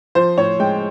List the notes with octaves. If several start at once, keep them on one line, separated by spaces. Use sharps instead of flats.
F3 C5
A2 C#5
G#3 G5